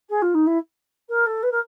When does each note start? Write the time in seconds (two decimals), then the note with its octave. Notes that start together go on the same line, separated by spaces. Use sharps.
0.09 G#4
0.22 F4
0.34 D#4
0.46 E4
1.09 A#4
1.26 A4
1.43 B4
1.51 A#4